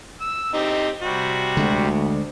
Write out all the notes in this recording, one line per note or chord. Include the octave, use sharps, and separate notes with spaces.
E6
C4 D#4 G4
C3 G3 F#4
D2 D3 G#3